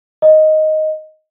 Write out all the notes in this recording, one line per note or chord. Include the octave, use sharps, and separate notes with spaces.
D#5